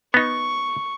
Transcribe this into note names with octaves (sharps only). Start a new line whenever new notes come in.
B3 D#4 C#6